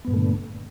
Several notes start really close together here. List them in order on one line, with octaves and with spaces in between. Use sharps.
B3 G2 A#2 A3 D3